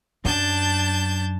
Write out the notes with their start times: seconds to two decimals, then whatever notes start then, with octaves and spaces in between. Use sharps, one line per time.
0.25 F#2 D4 A5 G6